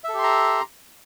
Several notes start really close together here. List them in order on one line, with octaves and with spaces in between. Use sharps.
E5 A4 G4 C6 A#5